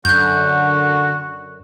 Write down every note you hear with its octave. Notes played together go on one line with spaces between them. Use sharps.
F#2 D3 F#4 F#6 G6